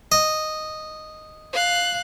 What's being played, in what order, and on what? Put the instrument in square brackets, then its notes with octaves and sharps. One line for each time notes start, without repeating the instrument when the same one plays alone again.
[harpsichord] D#5
[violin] F5 F#6